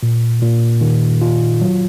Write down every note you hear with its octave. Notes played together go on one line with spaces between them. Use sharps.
A#2
A#2
D#3
F4
F#3